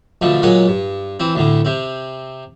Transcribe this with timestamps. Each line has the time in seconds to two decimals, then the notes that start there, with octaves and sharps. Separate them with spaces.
0.22 B2 D3 F3 A3
0.42 A#2 F#3 G#3 C#5 F#5
0.68 G2
1.20 E3 C4
1.35 D2 A2 D3
1.65 C3 C4